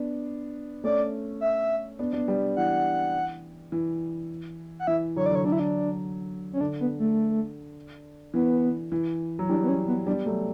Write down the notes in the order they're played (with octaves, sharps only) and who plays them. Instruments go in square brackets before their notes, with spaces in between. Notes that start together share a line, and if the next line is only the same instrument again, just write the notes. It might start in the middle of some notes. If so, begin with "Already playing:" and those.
Already playing: [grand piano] B3 D4
[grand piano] A3 C#4 [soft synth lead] D5
[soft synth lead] E5
[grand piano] B3 D4
B3 D4
G3 B3
[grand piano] E3 [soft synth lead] F#5
[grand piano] E3
[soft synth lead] F#5
[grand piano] E3 [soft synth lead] E5
[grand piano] D3 F#3 [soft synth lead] C#5
[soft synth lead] D5
[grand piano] D3 F#3 [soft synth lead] C#5
[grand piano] D3 F#3 [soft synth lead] D4
[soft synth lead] E4
D4
C#4
[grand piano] D3 [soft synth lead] D4
[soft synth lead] B3
A3
[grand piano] E3 [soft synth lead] B3
[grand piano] E3
F#3
[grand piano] E3 G3 [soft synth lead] D4
[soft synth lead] B3
C#4
B3
[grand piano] G3 B3 [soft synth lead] D4
[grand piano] F#3 A3